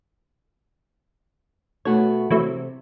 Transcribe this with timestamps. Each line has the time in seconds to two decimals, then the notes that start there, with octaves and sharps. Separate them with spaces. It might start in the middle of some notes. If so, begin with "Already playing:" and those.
1.85 B2 A3 F#4 C#5
2.31 C3 E3 F#3 A3